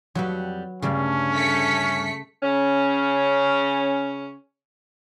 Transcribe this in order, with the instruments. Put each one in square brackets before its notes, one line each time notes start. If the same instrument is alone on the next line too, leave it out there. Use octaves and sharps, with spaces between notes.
[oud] F2 G3 F#4 [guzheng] F#3 B4
[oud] D2 G2 [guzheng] C#3 G3 [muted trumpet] C#4
[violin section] A3 B6 C#7
[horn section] C#3 C#4